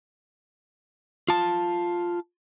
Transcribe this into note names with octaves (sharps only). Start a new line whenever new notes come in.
F4 A5